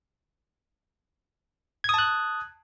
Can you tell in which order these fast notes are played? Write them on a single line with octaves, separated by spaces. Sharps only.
G#6 D#6 A5 F#6